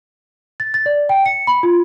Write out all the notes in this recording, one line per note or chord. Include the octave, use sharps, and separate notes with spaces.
A6
A6
D5
G5
C#7
B5
F4